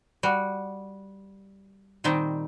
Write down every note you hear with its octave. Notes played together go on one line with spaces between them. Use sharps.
G3 F#4
A#2 D#3 G3 C4 D#4